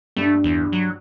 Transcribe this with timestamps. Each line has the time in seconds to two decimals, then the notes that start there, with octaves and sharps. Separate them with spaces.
0.17 G2 A3
0.44 E2
0.72 F#3